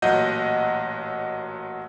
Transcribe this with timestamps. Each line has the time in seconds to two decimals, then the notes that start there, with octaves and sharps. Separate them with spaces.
0.02 A1 A#2 F#3 D#5 F#5 G6